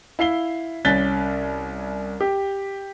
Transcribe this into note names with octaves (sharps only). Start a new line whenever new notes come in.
E4 F5 C7 G7
C2 C#4 F#6 A6 B6 G7
G4